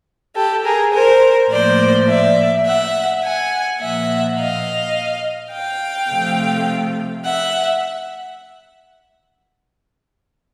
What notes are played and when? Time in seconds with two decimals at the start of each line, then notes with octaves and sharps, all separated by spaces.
0.35 G4 A4
0.64 G#4 A#4
0.92 A#4 C5
1.50 A2 F3 A#3 C5 D5
2.07 D5 E5
2.65 E5 F#5
3.22 F#5 G#5
3.79 A#2 F3 A#3 E5 F#5
4.38 D#5 F5
5.51 F5 G5
6.10 C3 F3 A3
7.24 E5 F#5